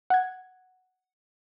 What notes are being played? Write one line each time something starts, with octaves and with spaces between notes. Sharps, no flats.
F#5 G#6